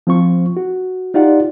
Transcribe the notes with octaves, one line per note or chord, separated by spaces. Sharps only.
F3 C4 F4 C#6
F#4
D#4 F4 G4 D5 F#5